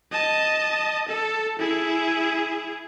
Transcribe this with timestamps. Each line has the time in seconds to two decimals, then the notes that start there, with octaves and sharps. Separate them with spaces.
0.12 D#5 A5
1.08 A4
1.59 E4 G#4